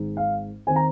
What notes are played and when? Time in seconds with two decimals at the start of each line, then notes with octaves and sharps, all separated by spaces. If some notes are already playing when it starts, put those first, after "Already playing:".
Already playing: G#1 G#2 G#3 D#4
0.17 F5
0.67 D#3 C4 D#4 G#5
0.76 A#5